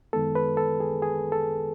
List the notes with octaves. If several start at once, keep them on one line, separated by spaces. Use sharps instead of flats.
F#2 D#3 G#3 B3 A4
B4
A4
G#4
G#4
A4